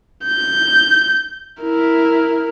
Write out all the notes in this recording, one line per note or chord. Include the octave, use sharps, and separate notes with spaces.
G6
E4 A#4